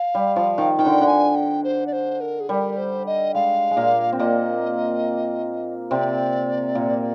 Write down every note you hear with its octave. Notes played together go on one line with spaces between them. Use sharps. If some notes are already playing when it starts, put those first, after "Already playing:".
Already playing: F5
G3
F3
D#3
D#3 G5
D3
D3
G#5
G5
C5
D5
C5
A#4
G#4
G3 A#4
C5
D#5
G#3 F5
G#3
A#2 A#3
C4
A#2 A#3 D#5
C3 C4 D5
A#2 A#3